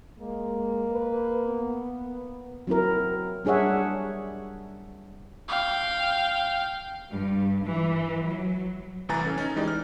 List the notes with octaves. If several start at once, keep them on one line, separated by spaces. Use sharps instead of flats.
G#3 A#3
B4
B3
F#3 C4 E4 A#4
G3 D4 G#4 C#5 E5 F#5
F5 G5
G2
E3
F#3
C2 A2 E3 G#5 A#5 A6
C#4 A4
C#4 D#4
E3 G#3 D#4 G4 D5
F6